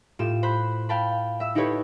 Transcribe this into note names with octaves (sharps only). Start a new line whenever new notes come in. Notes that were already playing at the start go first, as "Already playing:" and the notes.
A2 F4 G4 E7
C5 B5 F#6
F5 G5 A5 B5
E5 E6
D#4 E4 G4 A4 B4 C#5